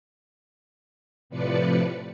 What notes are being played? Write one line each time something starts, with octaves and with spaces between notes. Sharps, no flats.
A2 C3 F3 B4 D5 C#7